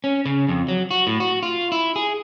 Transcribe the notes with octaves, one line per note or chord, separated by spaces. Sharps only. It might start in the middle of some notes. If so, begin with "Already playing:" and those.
C#4
C#3
F2
F#3
F#4
A2
F#4
F4
E4
G#4